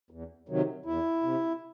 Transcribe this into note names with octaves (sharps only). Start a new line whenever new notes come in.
E2
C3 D#3 F#3
E2 E4
C3